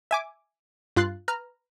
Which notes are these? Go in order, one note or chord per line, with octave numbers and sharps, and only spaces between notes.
E5 G#5 D6
G2 F4 C6 F#6 A6 C7
B4 A#5 F6